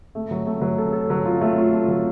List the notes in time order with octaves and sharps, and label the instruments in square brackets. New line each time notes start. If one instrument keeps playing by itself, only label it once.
[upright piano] A3
F#3
A3
F#3
A4
A4
F#3
F4
A3
F4
A3
F#3